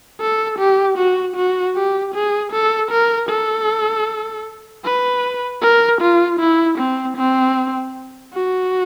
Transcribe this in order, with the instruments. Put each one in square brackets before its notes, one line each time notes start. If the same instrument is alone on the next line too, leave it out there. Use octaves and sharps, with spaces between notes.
[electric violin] A4
G4
F#4
F#4
G4
G#4
A4
A#4
A4
B4
A#4
F4
E4
C4
C4
F#4